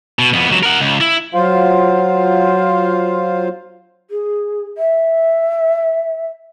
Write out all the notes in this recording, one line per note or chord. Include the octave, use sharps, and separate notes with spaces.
B2
F2 B3
C#2 F#3
A#4 F#5
C#2
E4
F#3 F4 C5 F5
G#4
E5